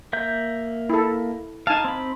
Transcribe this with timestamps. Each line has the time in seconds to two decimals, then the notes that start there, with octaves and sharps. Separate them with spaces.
0.13 A#3 E5 G6
0.90 E4 A4
1.67 D#4 F5 G#5 A5
1.85 C4 B5